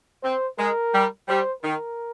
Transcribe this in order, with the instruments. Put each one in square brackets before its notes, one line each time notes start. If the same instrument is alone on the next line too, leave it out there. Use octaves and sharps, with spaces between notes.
[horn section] C4 [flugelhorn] C5
[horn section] G#3 [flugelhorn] A#4
[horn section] G3
[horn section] G3 [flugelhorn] C5
[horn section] D#3 [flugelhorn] A#4